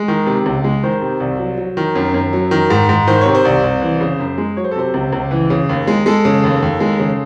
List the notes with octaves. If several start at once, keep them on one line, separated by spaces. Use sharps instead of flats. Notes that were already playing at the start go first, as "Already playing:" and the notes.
Already playing: G#3
D#3
C3
C#2
G#3
D#3 C5
C3
C2
F#3
F#3
D#3
F#2
F#2
F#3
D#3
G#2
G#2
D#3 C5
C3 C#5
C5
C2
C2
E3
C#3
F#2
G#3
F#3 C#5
C5
A4
C3 C5
C#2
C#2
E3
C#3
D#2
G#3
G#3 A4
C#3
D#2
D#2
G#3
C#3